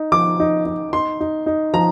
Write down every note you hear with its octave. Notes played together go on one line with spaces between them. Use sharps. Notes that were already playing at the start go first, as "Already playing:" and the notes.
Already playing: D#4
F3 D6
D#4
D#4
D#4 C6
D#4
D#4
F3 A#5